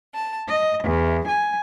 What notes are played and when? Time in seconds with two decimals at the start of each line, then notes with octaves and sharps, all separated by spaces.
0.15 A5
0.48 D#5
0.85 E2
1.28 G#5